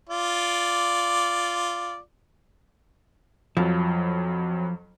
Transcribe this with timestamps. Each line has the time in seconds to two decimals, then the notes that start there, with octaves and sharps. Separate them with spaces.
0.09 F4 D5
3.57 F2 F3 F#3